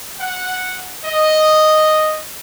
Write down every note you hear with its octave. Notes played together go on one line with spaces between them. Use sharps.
F#5
D#5